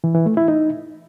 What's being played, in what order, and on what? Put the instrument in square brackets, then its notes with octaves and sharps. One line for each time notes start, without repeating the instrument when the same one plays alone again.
[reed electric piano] E3
E3
A3
E4
D#4